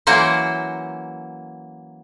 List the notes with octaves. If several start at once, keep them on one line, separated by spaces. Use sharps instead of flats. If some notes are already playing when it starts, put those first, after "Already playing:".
E3 F#3 A#3 C#4 C5